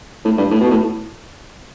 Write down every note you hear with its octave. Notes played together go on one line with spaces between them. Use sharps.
A2
G2
A2
B2
A2